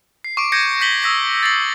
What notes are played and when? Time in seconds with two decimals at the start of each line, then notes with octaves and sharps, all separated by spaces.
0.24 C7
0.37 C#6 D6 D7
0.52 G6 G#6 A#6 C#7
0.81 G6 B6 F#7 G7
1.02 D#6 E6 A#6 B6
1.43 A6 C7 F#7